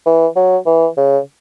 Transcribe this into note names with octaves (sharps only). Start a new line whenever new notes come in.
E3
F#3
E3
C#3